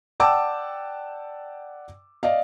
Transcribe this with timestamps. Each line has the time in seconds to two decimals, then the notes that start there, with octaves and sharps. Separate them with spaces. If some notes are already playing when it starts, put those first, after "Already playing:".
0.20 D5 F#5 G5 A5 D6 E6
2.23 D5 D#5 F5